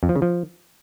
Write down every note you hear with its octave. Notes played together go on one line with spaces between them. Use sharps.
F2
F3
C#3
F3